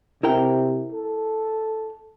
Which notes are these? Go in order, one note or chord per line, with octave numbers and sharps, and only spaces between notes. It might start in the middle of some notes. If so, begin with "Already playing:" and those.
C3 E4 A#4 G5
A4